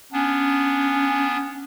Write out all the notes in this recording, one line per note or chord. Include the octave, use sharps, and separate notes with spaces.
B3 C#4 D4